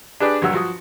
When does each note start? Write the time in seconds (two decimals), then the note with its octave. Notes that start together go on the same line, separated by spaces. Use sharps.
0.20 D4 G4 G#4 B4 D5 G5
0.42 A#1 G2 F#3 F#4 F#5 E6
0.53 F3 F#4 D#6